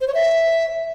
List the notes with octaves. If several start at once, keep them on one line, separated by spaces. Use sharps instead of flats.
C5
C#5
E5